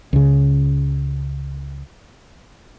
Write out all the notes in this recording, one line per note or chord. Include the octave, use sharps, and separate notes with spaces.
C#2 C#3